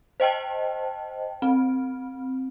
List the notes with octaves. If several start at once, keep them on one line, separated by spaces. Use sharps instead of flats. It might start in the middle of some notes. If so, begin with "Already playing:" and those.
C5 D#5 G5 A5
C4